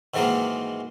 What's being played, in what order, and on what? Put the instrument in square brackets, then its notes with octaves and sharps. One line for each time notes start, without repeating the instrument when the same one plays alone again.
[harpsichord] G#2 D#3 E3 F#3 G#3 A#3